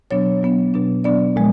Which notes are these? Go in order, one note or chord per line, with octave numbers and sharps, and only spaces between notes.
B2 F#3 B3 D4 C#5
B2 F#3 B3 D4
B2 F#3 B3 D4
B2 F#3 B3 D4 D5
A#2 F3 G#3